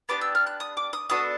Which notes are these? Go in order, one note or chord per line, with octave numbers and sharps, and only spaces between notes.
B3 D4 G4 D6
E6
F6
F#6
D#6
D6
D#6
B3 D4 F#4 A4 D#6